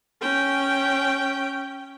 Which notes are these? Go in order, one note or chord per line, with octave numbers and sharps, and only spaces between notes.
C#4 G5